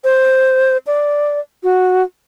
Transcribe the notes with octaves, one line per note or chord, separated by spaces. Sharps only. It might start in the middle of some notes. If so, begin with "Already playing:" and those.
C5
D5
F#4